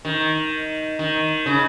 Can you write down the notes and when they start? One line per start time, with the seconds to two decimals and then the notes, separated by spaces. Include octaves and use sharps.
0.05 D#3
0.99 D#3
1.46 C#3